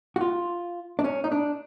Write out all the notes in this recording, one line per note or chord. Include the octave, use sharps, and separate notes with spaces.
F#4
F4
D4
C#4
D#4
D4